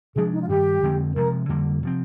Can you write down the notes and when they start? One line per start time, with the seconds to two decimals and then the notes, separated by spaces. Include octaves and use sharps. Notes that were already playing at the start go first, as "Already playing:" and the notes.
0.15 C3 F3 G#3 D4 G#4
0.32 D#4
0.41 F4
0.49 G2 D#3 G3 G4
0.82 F2 D3 G#3 C4
1.16 C3 F3 G#3 A#4
1.49 F2 D3 G3 A#3
1.83 C3 F3 C4